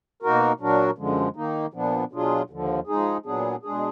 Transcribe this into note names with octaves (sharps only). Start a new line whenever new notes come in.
B2 A#3 D#4 F#4 A#4
A#2 F#3 D4 F#4 A#4
F#2 D3 F3 G#3
D#3 A#3 D#4
A#2 F3 B3 D4
B2 F#3 D4 F4 G#4
D#2 D3 F3
F3 G#3 D#4 G#4
A#2 F#3 B3 D4 G#4
B2 G#3 D4 G#4